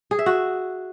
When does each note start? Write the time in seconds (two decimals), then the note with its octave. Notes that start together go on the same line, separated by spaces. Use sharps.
0.11 G#4
0.19 E5
0.26 F#4